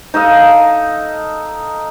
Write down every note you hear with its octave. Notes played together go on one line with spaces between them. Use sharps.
D#4 A4 D#5 F5